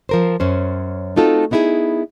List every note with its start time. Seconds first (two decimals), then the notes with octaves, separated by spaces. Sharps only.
0.09 F3 A#4 C5
0.40 F#2 C#4 C5
1.16 A3 C4 D#4 F4 F#4 A4
1.51 B3 D#4 E4 F#4 G#4